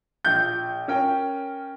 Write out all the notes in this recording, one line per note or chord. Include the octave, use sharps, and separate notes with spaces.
A#1 G6
C#4 A#4 G5